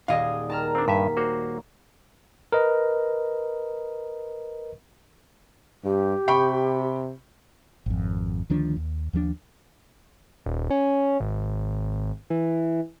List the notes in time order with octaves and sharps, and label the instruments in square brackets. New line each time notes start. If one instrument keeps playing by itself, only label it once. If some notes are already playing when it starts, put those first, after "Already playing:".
[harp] D#1 G#4 D#6 [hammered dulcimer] D5 [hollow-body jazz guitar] D#5 F5
[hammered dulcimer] D#3 [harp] A5 A#5 F6
[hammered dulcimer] A#3 [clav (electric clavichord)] C4 D4
[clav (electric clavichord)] G2 E5 [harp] B6
[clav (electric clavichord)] A#3 F#4 C5 [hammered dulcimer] C#5
[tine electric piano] A#4 B4 D#5
[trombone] G2 [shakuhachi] G4
[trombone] C3 [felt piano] G5 B5 C#6
[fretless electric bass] G#1 F2
D2 D#3 F3 D4
D#2
D#2 F3 F#3 D4
[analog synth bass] D#1
C#4
G#1
E3